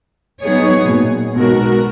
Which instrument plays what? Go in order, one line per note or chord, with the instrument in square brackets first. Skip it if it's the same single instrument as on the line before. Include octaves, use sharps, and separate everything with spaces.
[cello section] F#3 B3 D#4 G#4 C#5
[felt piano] B2
A#2
[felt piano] B1 B2 [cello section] G#3 B3 F#4 A#4